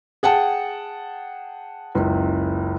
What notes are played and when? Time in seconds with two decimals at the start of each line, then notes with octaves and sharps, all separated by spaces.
0.23 G#4 F#5 G5 A5
1.95 F#1 C#2